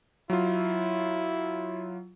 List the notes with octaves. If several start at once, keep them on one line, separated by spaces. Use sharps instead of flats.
F#3 E4 F4